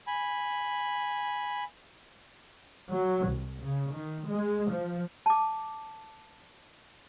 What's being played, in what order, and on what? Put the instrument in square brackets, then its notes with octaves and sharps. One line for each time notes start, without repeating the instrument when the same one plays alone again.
[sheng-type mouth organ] G#5 B5
[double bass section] F#3
C2
C#3
D#3
G#3
F3
[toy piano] A5 D6